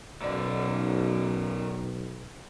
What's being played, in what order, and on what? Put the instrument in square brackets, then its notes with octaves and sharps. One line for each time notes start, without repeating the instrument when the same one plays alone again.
[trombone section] B1 [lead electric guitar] D#3 D5